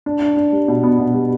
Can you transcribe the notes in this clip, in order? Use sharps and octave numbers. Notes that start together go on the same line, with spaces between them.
D4
D4
D4
G3
B2
B3
B2
G3